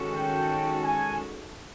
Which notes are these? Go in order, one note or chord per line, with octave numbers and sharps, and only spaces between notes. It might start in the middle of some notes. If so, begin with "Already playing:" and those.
Already playing: D#3 G#3 C#4 F#4 A4
G5
G#5